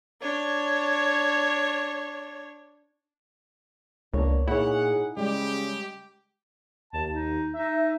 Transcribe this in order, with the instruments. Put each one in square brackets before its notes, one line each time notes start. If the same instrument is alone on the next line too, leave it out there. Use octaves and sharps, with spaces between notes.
[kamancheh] D4 C#5
[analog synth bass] C#2 [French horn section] A#3 B3 D4 [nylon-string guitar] A#4 C#5
[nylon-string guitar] A#2 C#5 [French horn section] D#4 G#4 [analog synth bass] E4 [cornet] F#5
[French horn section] C#3 G3 [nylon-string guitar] G#3 [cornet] G4
[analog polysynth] D#2 [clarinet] A5
[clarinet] D#4
[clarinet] D#4 [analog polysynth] E5